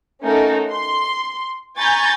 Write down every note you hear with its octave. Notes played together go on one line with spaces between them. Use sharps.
A3 C#4 D#4 F#4 A4 A#4
C6
G#5 A#5 B5 C#6 G6 A6